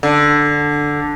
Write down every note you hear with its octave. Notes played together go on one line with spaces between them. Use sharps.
D3